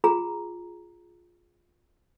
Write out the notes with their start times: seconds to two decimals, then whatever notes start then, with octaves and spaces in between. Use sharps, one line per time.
0.04 F4 G#4 A#5